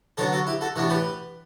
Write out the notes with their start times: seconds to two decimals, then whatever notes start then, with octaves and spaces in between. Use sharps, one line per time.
0.17 D3 F#3 B3 D4 A4 C#5
0.32 F#4 A4
0.47 E4 G4
0.61 F#4 A4
0.76 A2 E3 G3 B3 D4 F#4
0.90 G4 B4